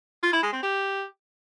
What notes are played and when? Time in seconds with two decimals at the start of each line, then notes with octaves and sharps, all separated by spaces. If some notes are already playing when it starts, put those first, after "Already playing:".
0.23 F4
0.33 E4
0.43 G#3
0.53 C4
0.63 G4